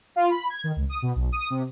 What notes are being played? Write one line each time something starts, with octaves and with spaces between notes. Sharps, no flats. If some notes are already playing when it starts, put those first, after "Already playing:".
F4
B5
G#6
D#3
C#2
D#6
B2
B1
D#6
C3